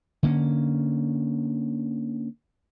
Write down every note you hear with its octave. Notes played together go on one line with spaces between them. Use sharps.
D3 A#3 C#4